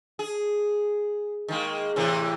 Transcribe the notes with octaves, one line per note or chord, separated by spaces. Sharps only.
G#4
D#3 G#3 A#3
A2 C3 E3